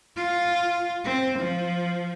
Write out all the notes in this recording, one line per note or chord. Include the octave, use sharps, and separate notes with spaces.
F4
C4
F3